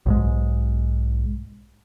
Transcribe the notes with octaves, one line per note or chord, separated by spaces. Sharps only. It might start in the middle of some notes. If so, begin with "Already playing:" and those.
B1 G#2 G#3